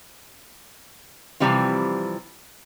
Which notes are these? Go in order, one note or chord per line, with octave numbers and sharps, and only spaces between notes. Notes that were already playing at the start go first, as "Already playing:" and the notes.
C3 E3 F3 G3 C4 F4